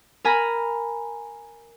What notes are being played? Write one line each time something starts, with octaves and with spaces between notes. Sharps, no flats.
A#4 G#5 A#5 B5